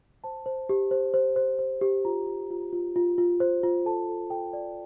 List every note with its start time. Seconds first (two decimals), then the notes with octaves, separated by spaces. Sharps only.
0.24 C5 A5
0.46 C5
0.69 G4
0.91 C5
1.14 C5
1.36 C5
1.59 C5
1.81 G4
2.05 F4 A#5
2.27 F4
2.50 F4
2.73 F4
2.96 F4
3.18 F4
3.40 C5
3.63 F4
3.86 A4 A5
4.09 A4
4.30 A4 G5
4.53 D5